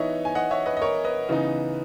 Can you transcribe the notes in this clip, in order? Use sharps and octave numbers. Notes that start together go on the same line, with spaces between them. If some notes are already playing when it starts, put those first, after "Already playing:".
Already playing: E3 B3 D#4 C#5 D#5 E5
G#5
D#5 F#5
C#5 E5
B4 D#5
D#5
A#4 C#5
B4 D#5
C#3 E3 B3 D#4